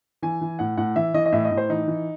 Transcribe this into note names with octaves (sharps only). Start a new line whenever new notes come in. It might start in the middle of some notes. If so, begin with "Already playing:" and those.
E3 G#5
E3
A2 F#5
A2 F#5
E3 E5
E3 D#5
D#5
A2 E5
D#5
A2
C5
E3 D#4
E3